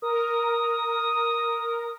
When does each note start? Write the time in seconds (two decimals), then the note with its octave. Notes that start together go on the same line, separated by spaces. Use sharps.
0.02 A#4 D#6